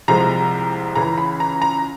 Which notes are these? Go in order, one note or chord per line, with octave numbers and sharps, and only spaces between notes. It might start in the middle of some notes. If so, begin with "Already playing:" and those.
C2 C3 F3 G#3 A#5
C#2 C#3 E3 A#5
B5
A#5
A#5